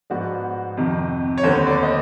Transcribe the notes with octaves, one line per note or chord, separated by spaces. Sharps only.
G#2 F3 G#3 B3 D4 F#4
F2 C3 D#3
C#5
D#2 D3 F#3 B3 C5
D5
D#5